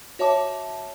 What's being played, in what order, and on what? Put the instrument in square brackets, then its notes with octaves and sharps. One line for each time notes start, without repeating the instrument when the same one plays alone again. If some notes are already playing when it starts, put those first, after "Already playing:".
[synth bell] F#4 C#5 E5 A5 D6